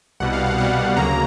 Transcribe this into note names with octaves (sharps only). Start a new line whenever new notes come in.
C2 B2 G3 F#5
F5
F#5
C2 B2 G3 F#5
D2 C#3 F#3 A#3 A#5